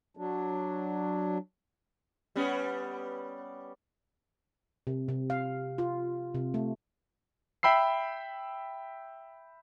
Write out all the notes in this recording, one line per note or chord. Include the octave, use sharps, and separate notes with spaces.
F#3 D4
G3 B3 C#4
C3
C3
F5
F4
C3
A3
E5 G5 B5 E6 C7